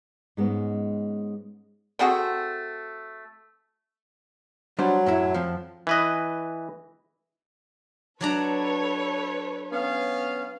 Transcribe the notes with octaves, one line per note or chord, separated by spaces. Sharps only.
G#2 G#3 B3 C#4
A3 C4 F#4 G#4
F#3 G3 D4 C5
F#2 A2 E4
F2 F3
E3 B4 D#5
F#3 D4 A4 B4 C#5 A#5
B3 C#4 F5